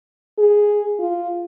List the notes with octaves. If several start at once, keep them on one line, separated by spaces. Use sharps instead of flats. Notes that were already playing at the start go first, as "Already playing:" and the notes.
G#4
F4